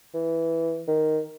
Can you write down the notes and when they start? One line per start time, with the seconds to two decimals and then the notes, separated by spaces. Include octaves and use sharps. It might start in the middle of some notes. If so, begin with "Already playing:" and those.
0.14 E3
0.87 D#3